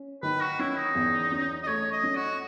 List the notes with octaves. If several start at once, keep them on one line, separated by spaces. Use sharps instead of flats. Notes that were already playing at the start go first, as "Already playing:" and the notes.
Already playing: C#4
D#3 B4
F#4
C#4 E4
E4
D#4
E2
C#4
D#5
A3 C#5
D#5
C#4
F#4